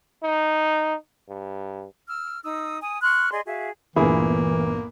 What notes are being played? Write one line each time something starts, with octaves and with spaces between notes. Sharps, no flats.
D#4
G2
E6 F6
D#4 D#6 E6
G#5 D#6
C6 C#6 F6 F#6
G#4 D5 D#5 C6
F#4 G#4 E5 F5
G1 D2 A#2 E3 A#3 B3 E4 G#4